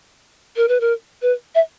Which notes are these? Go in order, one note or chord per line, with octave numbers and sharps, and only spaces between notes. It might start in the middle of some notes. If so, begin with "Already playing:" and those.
A#4
B4
A#4
B4
E5